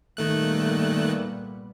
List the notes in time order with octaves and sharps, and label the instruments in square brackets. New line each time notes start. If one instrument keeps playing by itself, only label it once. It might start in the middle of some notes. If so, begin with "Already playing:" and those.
[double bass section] A#2 G3 B3 [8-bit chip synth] D#3 A3 F#6